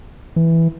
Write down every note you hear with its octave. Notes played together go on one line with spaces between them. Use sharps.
E3